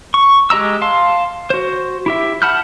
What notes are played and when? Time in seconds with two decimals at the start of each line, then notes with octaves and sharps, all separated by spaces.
0.14 C#6
0.50 G#3 G4 D#5 A#5 E6
0.82 F5 A5 C6
1.50 F#4 C5
2.06 E4 G4 E5
2.42 F#5 A5 B5 F6 G6